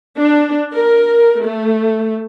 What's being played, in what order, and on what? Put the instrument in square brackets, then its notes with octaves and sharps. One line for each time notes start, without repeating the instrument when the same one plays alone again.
[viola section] D4
A#4
A3